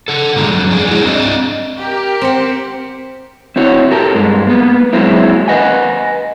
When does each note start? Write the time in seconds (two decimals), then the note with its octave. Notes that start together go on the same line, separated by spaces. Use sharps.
0.08 A4 F#5
0.36 A#2 D3 D#3 G3 G#3 A#5
0.52 F2 A#2 F#3
0.70 F2 G3 D4 G#4
0.87 G#3 E4 F#4 G#4
1.04 C4 D4 A4 D5 D#5
1.77 G4 A#4
2.21 C4 F#5
3.56 C4 E4 F#4 C#5
3.91 G4 A4 A#4
4.15 G2 G#3
4.47 A#3 B3
4.93 F#3 G#3 A#3 C4 E4
5.48 B4 D#5 F#5 G#5